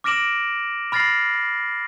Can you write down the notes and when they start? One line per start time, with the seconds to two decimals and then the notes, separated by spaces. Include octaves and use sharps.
0.04 D6 F6 A#6 D7 E7 F#7
0.92 B5 F6 A6 A#6 C7 F#7